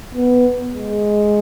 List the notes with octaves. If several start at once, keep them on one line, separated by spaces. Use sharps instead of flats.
B3
G#3